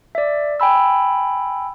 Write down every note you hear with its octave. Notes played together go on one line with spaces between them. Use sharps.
D5 E5
G5 G#5 B5 E6